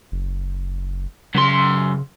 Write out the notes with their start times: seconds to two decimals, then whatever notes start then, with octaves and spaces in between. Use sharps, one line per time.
0.12 F#1
1.35 F#2 C#3 C6